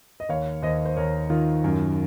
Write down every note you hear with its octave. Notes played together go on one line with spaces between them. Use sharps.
D#5
D#2 C#5 F5
D#2 C5 D#5
C5
D#2 A#4 C#5
D#3 F4
F#2